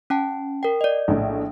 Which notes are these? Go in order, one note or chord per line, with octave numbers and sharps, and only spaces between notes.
C#4 G5 A5
A#4 G5
D5 D#5
A#1 A2